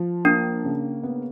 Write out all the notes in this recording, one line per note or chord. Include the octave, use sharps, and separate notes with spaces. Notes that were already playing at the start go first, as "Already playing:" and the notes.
Already playing: F3
A#3 D4
C#3
B3